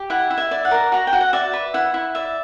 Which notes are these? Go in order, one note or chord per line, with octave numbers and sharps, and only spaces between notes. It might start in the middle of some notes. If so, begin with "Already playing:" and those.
Already playing: G4
E4 F#5
E4
E5
D5
F#5
A#4
F#4 A#5
G5
F#4
F#5
D5 E5
B4
E4 F#5
E4
D5 E5